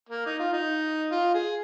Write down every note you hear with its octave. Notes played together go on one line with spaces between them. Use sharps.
A#3
D#4
F4
D#4
F4
G#4